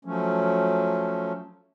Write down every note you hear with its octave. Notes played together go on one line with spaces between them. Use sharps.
F3 F#3 A3 C#4